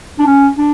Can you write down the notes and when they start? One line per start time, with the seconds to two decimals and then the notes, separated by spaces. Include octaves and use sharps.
0.19 D4
0.27 C#4
0.58 D4